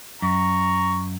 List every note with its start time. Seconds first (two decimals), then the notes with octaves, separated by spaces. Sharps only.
0.22 F#2 A#5 C#6